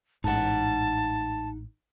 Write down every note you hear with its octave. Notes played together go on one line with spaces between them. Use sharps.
A1 G#2 D#4 F#5 A5